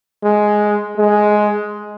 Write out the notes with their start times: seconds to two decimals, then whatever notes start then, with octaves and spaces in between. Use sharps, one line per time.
0.23 G#3
0.98 G#3